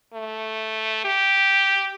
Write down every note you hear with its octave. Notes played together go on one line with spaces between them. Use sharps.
A3
G4